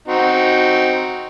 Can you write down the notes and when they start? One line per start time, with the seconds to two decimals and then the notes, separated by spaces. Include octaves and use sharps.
0.08 C4 D#4 F#4